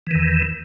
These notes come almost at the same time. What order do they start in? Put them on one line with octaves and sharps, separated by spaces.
E3 D#3 E2